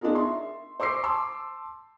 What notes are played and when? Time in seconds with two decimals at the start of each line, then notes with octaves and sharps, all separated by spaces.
0.01 B3 D4 D#4 F4 G#4 A#4
0.15 E5 C6
0.80 C5 C6 D6 E6 C7
1.04 A5 C6 D6 E6